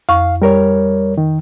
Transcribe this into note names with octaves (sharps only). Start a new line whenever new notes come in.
F2 F5 C#6
G3 A#4 C#5
D#3